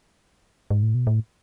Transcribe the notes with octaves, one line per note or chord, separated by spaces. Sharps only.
G#2
A2
B2
A2